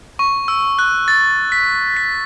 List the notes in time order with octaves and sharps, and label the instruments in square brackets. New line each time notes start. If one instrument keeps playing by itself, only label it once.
[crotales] C#6
E6
F#6
A6
B6
B6